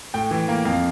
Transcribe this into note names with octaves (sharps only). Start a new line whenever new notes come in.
A2 G5
E3
A#3
F2 F5